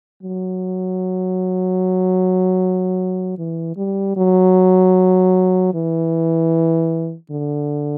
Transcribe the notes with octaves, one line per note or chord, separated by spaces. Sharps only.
F#3
E3
G3
F#3
E3
D3